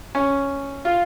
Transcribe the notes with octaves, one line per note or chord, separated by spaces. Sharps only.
C#4
F4